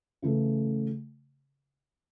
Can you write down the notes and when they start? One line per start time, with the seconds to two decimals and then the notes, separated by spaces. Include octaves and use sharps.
0.22 C#3 E3 A3